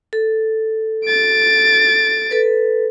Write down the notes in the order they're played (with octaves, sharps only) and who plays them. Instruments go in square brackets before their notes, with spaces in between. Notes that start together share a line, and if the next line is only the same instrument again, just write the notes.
[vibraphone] A4
[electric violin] A6 D7
[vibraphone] A4 B4